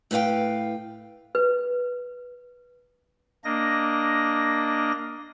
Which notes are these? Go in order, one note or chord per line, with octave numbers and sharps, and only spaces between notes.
A2 B4 C#5 F5 G5
B4
A#3 D4 D#5 A#6